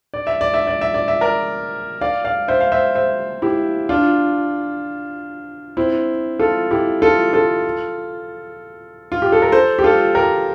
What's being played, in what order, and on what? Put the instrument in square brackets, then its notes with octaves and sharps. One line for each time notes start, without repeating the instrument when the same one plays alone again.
[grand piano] D5
E5
D5
E5
D5
E5
D5
E5
A#4 D5
D5 F5
D5 F5
C5 E5
F5
C5 E5
C5 E5
E4 G4
D4 F4
C4 E4
F4 A4
E4 G4
F4 A4
F4 A4
F4
G4
A4
A#4
A4 C5
G4
F4 A4
G4 A#4